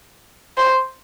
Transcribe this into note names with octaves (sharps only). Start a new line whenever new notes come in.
C5